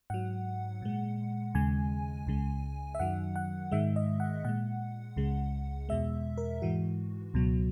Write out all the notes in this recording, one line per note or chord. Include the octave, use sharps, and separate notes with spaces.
G#2 F#3 F#5
A#2 G#3
D#2 C#3 G#3 G#5
C#2 C#3 G#3
E5
F#2 D#3 F#3 F#5
F#5
G#2 D#3 G#3 E5
D#5
F#5
A#2 G#3 F#5
C#2 C#3 G#3
E2 B2 G#3 E5
A#4
G#2 E3 G#3 F#4
C#2 B2 F#3